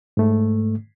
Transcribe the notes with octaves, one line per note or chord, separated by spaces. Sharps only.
G#2 A3